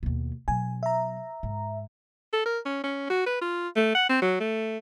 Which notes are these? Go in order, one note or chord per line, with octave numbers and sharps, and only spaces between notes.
D#2 B2
B2 F#3 G#5
E5 A#5
G#2
A4
A#4
C#4
C#4
F#4
B4
F4
A3
F#5
C4
F#3
A3